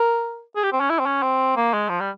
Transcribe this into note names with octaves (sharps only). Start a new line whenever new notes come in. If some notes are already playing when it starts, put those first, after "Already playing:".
Already playing: A#4
G#4
G4
C4
C#4
E4
C4
C#4
C4
A#3
G#3
F3
G3